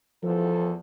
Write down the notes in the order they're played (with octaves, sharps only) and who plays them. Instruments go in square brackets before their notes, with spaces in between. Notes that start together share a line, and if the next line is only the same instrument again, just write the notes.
[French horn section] E2 A4 [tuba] F3